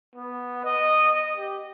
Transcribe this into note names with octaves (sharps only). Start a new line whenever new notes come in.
B3
D#5
G4